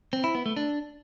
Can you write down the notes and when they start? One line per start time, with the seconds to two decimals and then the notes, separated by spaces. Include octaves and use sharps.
0.13 C4
0.24 E4
0.35 B3
0.46 A3
0.57 D4